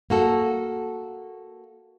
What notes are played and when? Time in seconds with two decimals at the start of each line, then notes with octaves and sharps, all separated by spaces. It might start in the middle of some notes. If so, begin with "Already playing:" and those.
0.10 A#3 F#4 A4